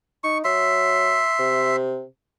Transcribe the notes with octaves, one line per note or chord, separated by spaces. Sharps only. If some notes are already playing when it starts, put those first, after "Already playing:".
D#4 C#6
F#3 E5 C6
C3